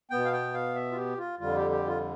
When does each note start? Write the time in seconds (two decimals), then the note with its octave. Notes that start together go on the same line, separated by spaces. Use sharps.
0.11 B2 B3 G5
0.25 F5
0.33 G5
0.54 F5
0.75 E5
0.91 F4
0.96 G4
1.18 F4
1.39 F2 D3 G3 F4
1.56 G4
1.71 G4
1.87 F4